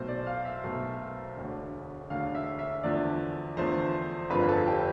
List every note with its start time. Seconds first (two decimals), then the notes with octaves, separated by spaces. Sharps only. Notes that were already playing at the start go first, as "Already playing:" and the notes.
Already playing: B1 B2 A3 C5
0.08 D5
0.27 F5
0.45 E5
0.64 B1 B2 A3
1.37 E1 D2 D3
2.10 E1 D2 D3 F5
2.35 E5
2.59 E5
2.83 E2 D3 F3 A3 D5
3.57 E2 D3 F3 A3 C5
4.30 G1 F2 D3 F3 B4
4.49 A4
4.67 G4